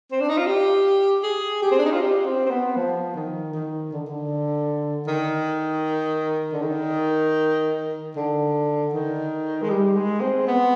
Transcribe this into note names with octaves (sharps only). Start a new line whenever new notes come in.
C4
D4
D#4
F4
G4
G#4
G4
C4
D4
D#4
F4
G4
C4
C4
B3
F3
D#3
D#3
D3
D3
D#3
D3
D#3
D3
D#3
G#3
G3
G#3
C4
B3